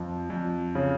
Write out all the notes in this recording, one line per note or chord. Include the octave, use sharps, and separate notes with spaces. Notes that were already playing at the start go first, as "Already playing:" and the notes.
Already playing: F2 F3
F2
C#3